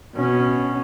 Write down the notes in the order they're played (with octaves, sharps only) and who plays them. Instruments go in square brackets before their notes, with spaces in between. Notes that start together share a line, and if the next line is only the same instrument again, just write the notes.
[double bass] B2 C#4